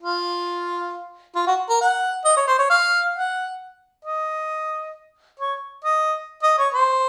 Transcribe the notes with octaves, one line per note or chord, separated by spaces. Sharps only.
F4
F4
F#4
A#4
F#5
D#5
C#5
C5
C#5
F5
F#5
D#5
C#5
D#5
D#5
C#5
C5